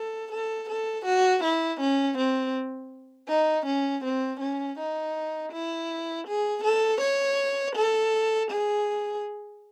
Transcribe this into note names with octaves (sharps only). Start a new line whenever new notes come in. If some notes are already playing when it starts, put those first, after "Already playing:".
Already playing: A4
A4
A4
F#4
E4
C#4
C4
D#4
C#4
C4
C#4
D#4
E4
G#4
A4
C#5
A4
G#4